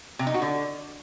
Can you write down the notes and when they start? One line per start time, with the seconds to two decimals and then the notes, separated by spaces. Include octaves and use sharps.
0.19 C3
0.27 D#4
0.34 F#4
0.42 D3